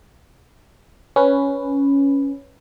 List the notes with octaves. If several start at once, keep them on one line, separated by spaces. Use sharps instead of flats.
C#4 B4